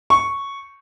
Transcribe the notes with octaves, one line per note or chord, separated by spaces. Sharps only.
C#6